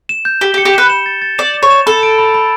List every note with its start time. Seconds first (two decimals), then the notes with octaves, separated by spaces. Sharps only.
0.09 E7
0.25 G6
0.41 G4 G7
0.54 G4
0.58 C#7
0.65 G4
0.73 B4 E7
0.90 E7
1.06 A6
1.22 A6
1.38 D5 E7
1.54 E7
1.63 C#5
1.70 E7
1.86 A4 B5
2.03 D7
2.18 B5
2.34 B5